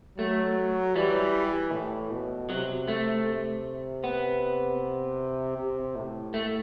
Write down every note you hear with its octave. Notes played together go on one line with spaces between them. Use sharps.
F#3 A3
E3 G3
A2
B2
C3 F#3
A3
B3
C3
A2
A3